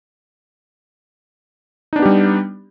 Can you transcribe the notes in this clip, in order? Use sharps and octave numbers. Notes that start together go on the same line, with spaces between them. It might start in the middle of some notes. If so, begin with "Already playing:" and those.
G3 B3 D4 D#4 G4